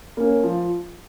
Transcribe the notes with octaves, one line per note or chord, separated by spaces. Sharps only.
A#3 C#4
F3